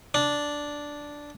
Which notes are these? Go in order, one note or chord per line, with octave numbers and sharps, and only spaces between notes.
D4